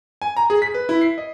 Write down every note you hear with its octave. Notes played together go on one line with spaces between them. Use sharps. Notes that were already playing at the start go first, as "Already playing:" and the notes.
G#5
A#5
G#4
B6
B4
E4
C7
D#5